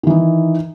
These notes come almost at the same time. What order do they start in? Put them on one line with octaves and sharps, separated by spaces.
D#3 E3 D#4